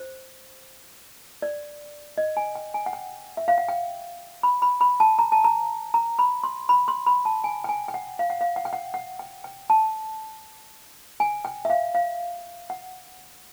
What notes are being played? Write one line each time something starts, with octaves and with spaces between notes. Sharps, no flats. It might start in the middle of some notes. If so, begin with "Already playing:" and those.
Already playing: C5
D5
D#5
G#5
G5
G#5
F#5
G5
E5
F5
F#5
G5
B5
B5
B5
A5
A#5
A5
A#5
A#5
B5
C6
B5
C6
B5
A5
G#5
G5
G#5
G5
F#5
F5
F#5
F5
F#5
G5
F#5
F#5
G5
G5
A5
G#5
G5
E5
F5
F5
F#5